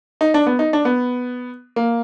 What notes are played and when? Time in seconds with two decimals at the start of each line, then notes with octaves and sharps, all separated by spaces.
0.21 D#4
0.34 D4
0.47 B3
0.59 D#4
0.73 D4
0.85 B3
1.76 A#3